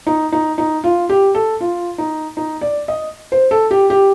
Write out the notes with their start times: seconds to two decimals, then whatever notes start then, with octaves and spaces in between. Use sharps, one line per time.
0.07 D#4
0.32 D#4
0.58 D#4
0.84 F4
1.09 G4
1.35 A4
1.60 F4
1.98 D#4
2.37 D#4
2.61 D5
2.88 D#5
3.32 C5
3.51 A4
3.71 G4
3.90 G4